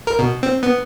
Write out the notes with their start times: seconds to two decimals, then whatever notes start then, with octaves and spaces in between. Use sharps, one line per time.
0.07 A#4
0.19 B2
0.43 C4
0.63 B3